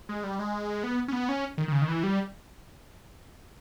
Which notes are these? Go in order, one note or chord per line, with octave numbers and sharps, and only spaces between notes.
G#3
G3
G#3
B3
C#4
B3
C#4
D#3
D#3
C#3
D#3
E3
G3